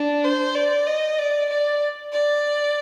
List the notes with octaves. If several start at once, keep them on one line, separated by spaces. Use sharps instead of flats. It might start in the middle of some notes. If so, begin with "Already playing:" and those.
Already playing: D4
C5
D5
D#5
D5
D5
D5